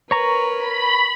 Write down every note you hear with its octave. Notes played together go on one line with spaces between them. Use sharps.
A#4 B4 C#5 A#5 C#6
B5